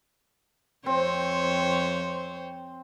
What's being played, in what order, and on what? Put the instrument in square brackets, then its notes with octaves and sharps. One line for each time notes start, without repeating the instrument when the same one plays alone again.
[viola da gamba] F2 C5 C#5 [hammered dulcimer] C4